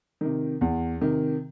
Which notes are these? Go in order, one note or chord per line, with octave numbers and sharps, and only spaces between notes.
C3 D#3
E2
C3 D#3